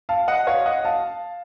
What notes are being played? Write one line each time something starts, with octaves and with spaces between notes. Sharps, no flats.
F5 A5
D#5 F#5
C#5 F5
D#5 F#5
F5 A5